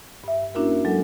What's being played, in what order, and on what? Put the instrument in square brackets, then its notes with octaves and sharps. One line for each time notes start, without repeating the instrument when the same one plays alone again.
[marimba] G2 E5
A#3 C#4 D4 E4 F#4 A#4
F#3 G#3 A4